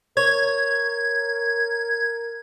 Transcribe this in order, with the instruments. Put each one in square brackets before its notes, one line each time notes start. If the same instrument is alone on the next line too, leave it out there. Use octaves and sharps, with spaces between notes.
[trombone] A#4 [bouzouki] C#5 [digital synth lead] G#6